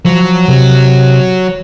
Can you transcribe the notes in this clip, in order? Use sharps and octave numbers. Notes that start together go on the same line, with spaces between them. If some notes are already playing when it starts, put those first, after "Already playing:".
F3 F#3
C3